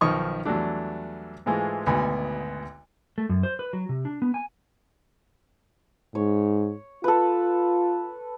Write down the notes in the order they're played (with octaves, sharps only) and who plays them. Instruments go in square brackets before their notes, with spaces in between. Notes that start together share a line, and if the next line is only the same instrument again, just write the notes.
[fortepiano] B1 D#3 F3 C#6 D#6
E2 F#3 G3 A3 D4
G#2 E3 G#3 A3 F4
G#1 D2 B2 B3 G#5
[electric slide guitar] A3
F#2
C5
B4
F#3
C3
D4
B3
G#5
[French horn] G#2 [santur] C#5
[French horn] F4 [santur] A4 B4